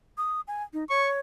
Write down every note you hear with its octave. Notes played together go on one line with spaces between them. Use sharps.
D#6
G#5
D#4
C#5 C#6